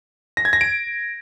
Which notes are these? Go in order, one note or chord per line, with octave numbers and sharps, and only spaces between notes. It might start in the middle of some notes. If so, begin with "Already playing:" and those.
A#6
G#6
A#6
D7